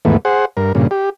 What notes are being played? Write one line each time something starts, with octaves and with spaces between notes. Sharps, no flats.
D#2 G#2 E3 A3 B3
G#4 C5 F#5
G2 A#4
G2 A#2 C#3
G4